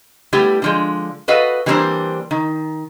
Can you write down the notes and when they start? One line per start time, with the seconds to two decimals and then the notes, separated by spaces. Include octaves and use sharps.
0.33 G3 A3 B3 E4 G4
0.62 D3 F3 G#3
1.28 F#4 A4 B4 D#5 F5 F#5
1.66 E3 G3 A#3 C4 D4 C5
2.31 D#3